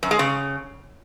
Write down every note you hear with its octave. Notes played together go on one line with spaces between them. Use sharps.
F#2
G#3
C#3